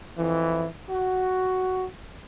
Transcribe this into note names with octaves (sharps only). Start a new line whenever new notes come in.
F2 E3
F#4